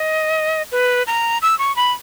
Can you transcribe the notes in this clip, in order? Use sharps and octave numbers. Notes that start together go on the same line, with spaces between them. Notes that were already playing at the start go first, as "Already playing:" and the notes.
Already playing: D#5
B4
A#5
E6
C#6
B5